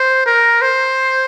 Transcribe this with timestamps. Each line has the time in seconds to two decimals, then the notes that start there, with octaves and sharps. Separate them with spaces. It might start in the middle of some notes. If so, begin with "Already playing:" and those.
Already playing: C5
0.26 A#4
0.62 C5